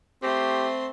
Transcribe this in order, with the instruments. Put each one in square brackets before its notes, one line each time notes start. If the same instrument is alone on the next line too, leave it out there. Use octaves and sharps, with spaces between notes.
[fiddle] A3 C6 [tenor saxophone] C4 [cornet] G4